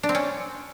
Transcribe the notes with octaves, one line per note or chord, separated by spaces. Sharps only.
D4
C4
C#4